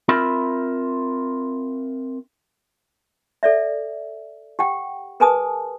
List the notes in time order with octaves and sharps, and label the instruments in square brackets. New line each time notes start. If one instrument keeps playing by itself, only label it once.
[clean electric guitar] C4 F4 A#4 E5 B5
[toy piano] A4 D5 E5
G4 F#5 G5
G#4 A#4 B4 G#5 A5 D#6